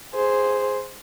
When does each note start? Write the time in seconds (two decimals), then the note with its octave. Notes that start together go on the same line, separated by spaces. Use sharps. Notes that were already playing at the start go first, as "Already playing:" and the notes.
0.15 G#4 C5